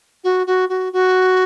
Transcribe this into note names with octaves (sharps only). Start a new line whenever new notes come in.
F#4
F#4
F#4
F#4